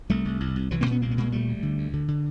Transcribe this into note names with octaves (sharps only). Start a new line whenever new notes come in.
C2 G3 A3
C2
C2
C2
C2 E3 F#3
A#3 C4
A#2
B3 C#4
C2 A#3 C4
B3
A#2 G#3 A#3
D2 G3 A3
D2
D3
D2
D3
D3